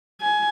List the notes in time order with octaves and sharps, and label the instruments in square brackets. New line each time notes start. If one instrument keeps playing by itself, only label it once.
[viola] G#5